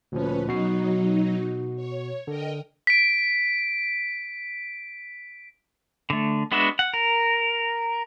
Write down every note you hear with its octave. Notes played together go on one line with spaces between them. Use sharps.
D2 A#2 F3 C#4 B4
B2 F#3 D#4 F#4 C7
C#5
D3 A#4 D#5 G5
B6 D7
D3 A3
G#3 B3 D4 F#4 E5
F#5
A#4